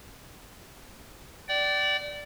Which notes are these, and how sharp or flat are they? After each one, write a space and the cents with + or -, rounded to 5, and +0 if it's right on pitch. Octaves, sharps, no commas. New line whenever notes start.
D5 +0 G5 -40